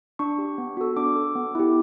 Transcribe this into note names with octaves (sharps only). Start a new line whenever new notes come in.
D4 C#6
G4
B3
F#4 A4
D4 D6
A4
B3
E4 G4